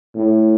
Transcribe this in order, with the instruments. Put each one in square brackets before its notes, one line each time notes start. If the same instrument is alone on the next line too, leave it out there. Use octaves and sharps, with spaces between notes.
[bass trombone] A2